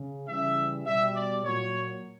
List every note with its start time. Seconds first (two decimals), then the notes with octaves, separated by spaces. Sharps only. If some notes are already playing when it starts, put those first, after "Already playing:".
Already playing: C#3
0.28 C#3 E3 G3 E5
0.86 B2 G3 E5
1.15 D5
1.43 A#2 F#3 C#5